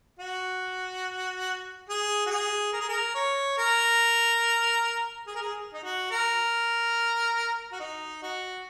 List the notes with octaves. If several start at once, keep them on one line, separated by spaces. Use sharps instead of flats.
F#4
G#4
F#4
G#4
A#4
G#4
A#4
C#5
A#4
G#4
A#4
G#4
D#4
F#4
A#4
F#4
D#4
F#4